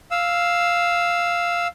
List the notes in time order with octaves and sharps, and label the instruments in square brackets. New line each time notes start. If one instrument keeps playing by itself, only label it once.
[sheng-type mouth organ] F5 E6